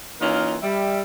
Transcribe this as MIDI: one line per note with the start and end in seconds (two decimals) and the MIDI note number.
0.21 0.56 52
0.21 0.56 58
0.21 0.56 61
0.21 0.56 63
0.21 0.56 65
0.21 0.56 70
0.63 1.01 55
0.63 1.01 76